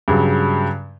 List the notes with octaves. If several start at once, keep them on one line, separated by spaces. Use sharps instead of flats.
G2 C#3 F#3